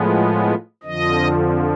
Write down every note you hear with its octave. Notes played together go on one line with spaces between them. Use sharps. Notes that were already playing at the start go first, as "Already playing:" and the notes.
Already playing: A2 F3 G#3 B3
F2 D3 F3 D#5